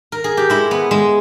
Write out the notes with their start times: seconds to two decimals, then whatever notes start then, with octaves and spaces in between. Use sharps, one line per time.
0.12 A#4
0.24 G#4
0.37 G4
0.50 G#3 E4
0.71 B3
0.91 G#3